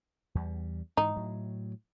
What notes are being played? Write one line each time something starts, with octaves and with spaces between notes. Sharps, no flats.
E2 G3
G#2 E3 D#4
A2 F#3